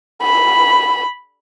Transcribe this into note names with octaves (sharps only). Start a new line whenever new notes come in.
B5